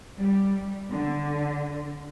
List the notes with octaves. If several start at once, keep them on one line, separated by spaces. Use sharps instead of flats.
G3
D3